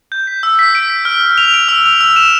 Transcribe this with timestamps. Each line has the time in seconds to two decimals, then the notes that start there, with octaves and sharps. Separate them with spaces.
0.12 G6
0.27 B6
0.43 E6
0.59 B6
0.75 D7
0.90 B6
1.05 F6
1.21 F6
1.38 F7
1.54 D7
1.69 E6
1.86 F7
2.01 E6
2.16 E7